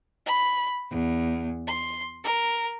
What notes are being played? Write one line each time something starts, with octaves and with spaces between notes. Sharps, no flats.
B5
E2
C6
A#4